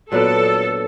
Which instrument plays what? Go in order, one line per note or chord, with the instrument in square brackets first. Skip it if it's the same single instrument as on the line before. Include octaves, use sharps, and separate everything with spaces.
[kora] A#2 F#3 B3 D4 [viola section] A4